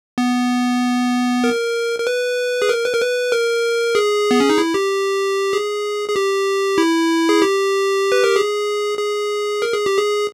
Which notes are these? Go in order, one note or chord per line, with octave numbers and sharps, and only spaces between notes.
B3
A#4
A#4
B4
G#4
A#4
B4
A#4
B4
A#4
G#4
B3
C#4
D#4
E4
G4
G#4
G#4
G4
E4
G#4
G4
B4
A#4
G#4
G#4
A#4
G#4
G4
G#4